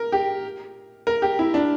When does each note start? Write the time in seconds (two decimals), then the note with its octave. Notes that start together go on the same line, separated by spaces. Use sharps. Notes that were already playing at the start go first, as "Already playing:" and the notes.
Already playing: A#4
0.12 G4
1.07 A#4
1.22 G4
1.39 E4
1.54 D4